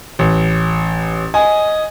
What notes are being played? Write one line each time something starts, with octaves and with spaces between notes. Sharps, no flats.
A1
D#5 G#5